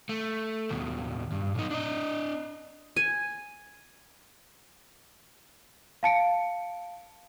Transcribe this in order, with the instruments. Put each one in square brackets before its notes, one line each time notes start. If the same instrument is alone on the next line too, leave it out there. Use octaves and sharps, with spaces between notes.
[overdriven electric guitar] A3
D#2 B2
G2
B1 D#4
D4 D#5
[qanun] G#5
[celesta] F5 A5 C#7 D7